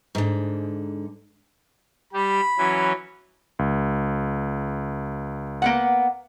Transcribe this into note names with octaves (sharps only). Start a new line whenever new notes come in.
G#2 D3
G3 G4 B5
E3 F#3 C#4
C#2
A#3 B3 F#5